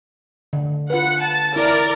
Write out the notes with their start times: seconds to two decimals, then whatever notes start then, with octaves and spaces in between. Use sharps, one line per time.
0.53 D3
0.90 F4 B4 F#5
1.21 A5
1.56 E4 A#4 D5